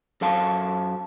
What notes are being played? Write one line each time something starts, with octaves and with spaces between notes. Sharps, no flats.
F#2 A4 F5 A5